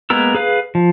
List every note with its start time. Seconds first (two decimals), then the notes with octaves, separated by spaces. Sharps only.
0.10 G#3 A#3 B3 A#4 E6
0.35 G#4 B4 F5
0.75 F3